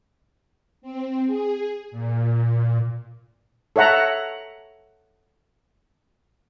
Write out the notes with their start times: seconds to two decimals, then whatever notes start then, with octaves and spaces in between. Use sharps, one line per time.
0.82 C4
1.26 G#4
1.91 A#2
3.76 A4 C#5 E5 F#5 A#5